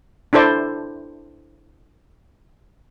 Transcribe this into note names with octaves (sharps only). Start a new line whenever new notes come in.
D4 E4 A4 C5 D5